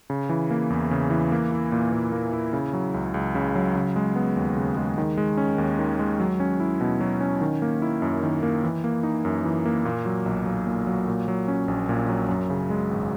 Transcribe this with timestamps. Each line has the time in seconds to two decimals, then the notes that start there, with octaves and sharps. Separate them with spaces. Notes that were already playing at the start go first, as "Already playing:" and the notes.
0.10 C#3
0.29 E3
0.50 A#3
0.70 E2
0.91 C#3
1.10 E3
1.32 A#3
1.52 E4
1.72 A#2
1.92 A#2
2.12 A#3
2.33 E4
2.53 C#3
2.73 F#3
2.94 C#2
3.14 C#2
3.35 C#3
3.55 F#3
3.75 C#3
3.96 G#3
4.16 B3
4.36 D#2
4.57 C#3
4.77 G#3
4.98 D#3
5.18 G#3
5.37 C#4
5.58 D#2
5.79 D#3
5.99 G#3
6.20 F#3
6.40 C#4
6.60 E4
6.81 B2
7.01 F#3
7.21 C#4
7.41 D#3
7.62 A#3
7.82 E4
8.02 F#2
8.23 D#3
8.43 A#3
8.64 E3
8.84 A#3
9.03 D#4
9.25 F#2
9.45 E3
9.66 A#3
9.85 A#2
10.06 F#3
10.26 B1
10.46 B1
10.67 A#2
10.87 F#3
11.08 A#2
11.28 F#3
11.48 C#4
11.68 A#1
11.89 A#2
12.09 F#3
12.29 F#2
12.50 C#3
12.70 G#3
12.91 G#1